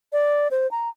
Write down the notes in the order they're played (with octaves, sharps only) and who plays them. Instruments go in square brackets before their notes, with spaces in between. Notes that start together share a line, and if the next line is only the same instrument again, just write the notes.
[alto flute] D5
C5
A#5